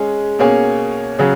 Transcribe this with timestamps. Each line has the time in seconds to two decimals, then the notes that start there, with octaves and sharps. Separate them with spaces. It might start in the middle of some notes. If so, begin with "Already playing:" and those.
Already playing: G#3 C#4 G#4
0.39 B2 A#3 C#4 G#4 C#5
1.19 C#3 F#3 C#4 G#4